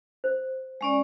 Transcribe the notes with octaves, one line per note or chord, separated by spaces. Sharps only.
C5
G#3 C#4 D5